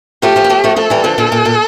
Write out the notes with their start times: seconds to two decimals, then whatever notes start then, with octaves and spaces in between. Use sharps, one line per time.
0.22 F3 A3 G4
0.36 F3 A3
0.44 A#3
0.50 F3 A3
0.64 F3 A3
0.76 F3 A3 A4
0.90 E3 G3
1.04 D3 F3
1.18 A#2 D3
1.32 A#2
1.45 A#2